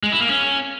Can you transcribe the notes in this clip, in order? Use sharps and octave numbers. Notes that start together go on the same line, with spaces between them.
G#3
E4
A#3
C#4